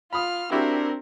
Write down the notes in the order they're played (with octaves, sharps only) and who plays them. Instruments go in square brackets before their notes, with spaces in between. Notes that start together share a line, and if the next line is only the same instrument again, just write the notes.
[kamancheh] F4 F6 [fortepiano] B5 D#6
[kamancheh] C4 A#4 [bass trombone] D4 [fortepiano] E4 F#4 G4